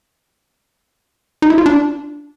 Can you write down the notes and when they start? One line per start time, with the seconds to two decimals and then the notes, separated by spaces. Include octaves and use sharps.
1.42 D#4
1.50 E4
1.58 F4
1.66 D4